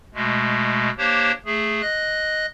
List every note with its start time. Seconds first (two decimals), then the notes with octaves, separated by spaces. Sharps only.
0.14 B2 G#3 A3
0.98 A#3 D4 G4 C5 C#5
1.45 A3 G#4
1.82 D#5 F#6